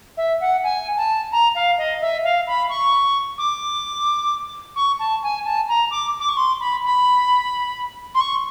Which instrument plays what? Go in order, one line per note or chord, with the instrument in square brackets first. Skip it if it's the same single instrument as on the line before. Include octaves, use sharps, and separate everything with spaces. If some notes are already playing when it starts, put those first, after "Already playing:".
[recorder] E5
F#5
G#5
A5
A#5
F5
D#5
E5
F5
B5
C#6
D6
C#6
A5
G#5
A5
A#5
D6
D6
C#6
C6
B5
B5
C6
C#6